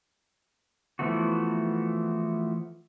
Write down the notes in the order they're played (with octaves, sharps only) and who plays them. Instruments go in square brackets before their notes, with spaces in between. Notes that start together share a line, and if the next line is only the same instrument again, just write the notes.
[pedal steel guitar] E3 F3 A3 B3 F#4